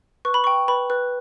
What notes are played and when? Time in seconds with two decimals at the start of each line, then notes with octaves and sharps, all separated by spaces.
0.25 B4 C#6
0.34 B5
0.44 G5 C#6
0.68 B4 B5
0.90 B4